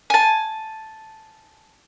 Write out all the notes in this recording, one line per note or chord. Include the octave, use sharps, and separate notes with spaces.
G#5 A5